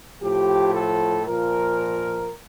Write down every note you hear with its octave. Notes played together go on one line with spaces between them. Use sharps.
A2 F3 G4
A4
A#2 F3 A#4